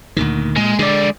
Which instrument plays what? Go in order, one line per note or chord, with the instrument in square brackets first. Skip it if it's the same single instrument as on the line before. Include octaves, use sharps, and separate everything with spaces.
[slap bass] D2 A#2 D#3
[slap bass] A#2 [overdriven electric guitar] G#3
[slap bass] D3 [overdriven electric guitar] G#3 D5